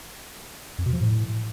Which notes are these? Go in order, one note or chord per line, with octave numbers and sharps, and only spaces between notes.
F2
B2
F3
A2